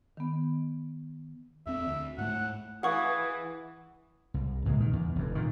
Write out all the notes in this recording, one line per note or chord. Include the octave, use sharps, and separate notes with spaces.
D#3 B3
E2 C4 E5
D2
G#2 A3 F#5
E3 G#4 F5 F#5 C#6 D#6
C2
C#2 A#2 G#3
D#3
E2
F1 F2
A#2 D#3